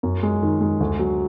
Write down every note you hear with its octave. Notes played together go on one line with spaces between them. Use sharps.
F#2
G#3
D#3
G#3
D2
F#3